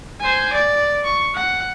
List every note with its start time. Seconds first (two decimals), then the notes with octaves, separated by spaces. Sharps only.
0.20 C5 G#5
0.53 D5
1.05 C#6
1.35 F#5